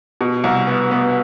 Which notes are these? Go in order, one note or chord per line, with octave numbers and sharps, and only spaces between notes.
B2
C2
B3
B3